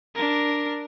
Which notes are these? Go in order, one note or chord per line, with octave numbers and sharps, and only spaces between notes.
D4 A#4